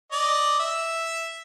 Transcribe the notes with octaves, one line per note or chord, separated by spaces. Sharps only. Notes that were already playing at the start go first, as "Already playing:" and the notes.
D5 D#5
E5